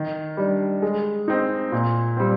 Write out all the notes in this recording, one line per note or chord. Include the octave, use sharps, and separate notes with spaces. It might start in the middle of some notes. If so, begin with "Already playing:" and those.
Already playing: D#3
G3 D4
G#3
C4 D#4
A#2
G3 C4